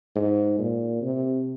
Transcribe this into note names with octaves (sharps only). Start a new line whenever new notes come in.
G#2
A#2
C3